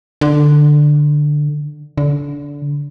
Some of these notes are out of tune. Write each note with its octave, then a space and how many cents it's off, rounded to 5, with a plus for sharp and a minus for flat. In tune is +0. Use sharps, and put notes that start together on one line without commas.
D3 +10
D3 -25